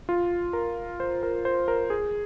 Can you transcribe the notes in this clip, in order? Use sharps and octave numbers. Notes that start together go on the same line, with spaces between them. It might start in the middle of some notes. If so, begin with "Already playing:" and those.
F4
A#4
C5
A#4
C5
A#4
G#4